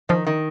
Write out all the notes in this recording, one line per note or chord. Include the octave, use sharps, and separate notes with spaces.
D#3 F3
D#3